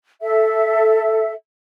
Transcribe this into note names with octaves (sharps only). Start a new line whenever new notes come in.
A4 E5